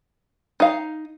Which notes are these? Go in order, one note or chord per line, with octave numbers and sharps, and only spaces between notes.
D#4 F5